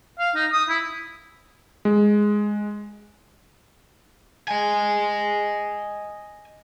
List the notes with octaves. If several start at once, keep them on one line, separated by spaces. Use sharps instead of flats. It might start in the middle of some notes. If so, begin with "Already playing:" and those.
F5
D#4
D#6
E4
G#3
D#5 G#5